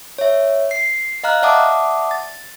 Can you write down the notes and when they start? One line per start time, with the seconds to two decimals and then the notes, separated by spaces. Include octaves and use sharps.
0.18 C#5 E5
0.71 C7
1.23 D#5 F5 A#5 F6 F#6
1.42 D5 E5 F#5 A5 D6 D#6
2.11 A6